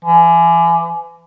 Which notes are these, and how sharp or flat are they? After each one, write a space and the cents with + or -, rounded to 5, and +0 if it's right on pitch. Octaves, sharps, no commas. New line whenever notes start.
E3 +35